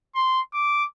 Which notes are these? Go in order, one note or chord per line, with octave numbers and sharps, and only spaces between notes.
C6
D6